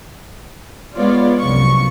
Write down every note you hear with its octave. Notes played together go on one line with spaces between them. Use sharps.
G#3 B3 F4 C#5 D5
C2 F#2 F3 C#6